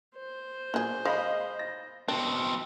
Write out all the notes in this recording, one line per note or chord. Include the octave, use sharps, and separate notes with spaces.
C5
A#2 F#3 G#4
G#3 D#5 F5 B5
A#6
B2 C4 D4